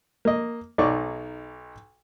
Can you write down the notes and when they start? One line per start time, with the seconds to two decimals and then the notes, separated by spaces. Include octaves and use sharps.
0.25 A#3 D#5
0.78 B1 D#4 C#5 D5 C#6 D6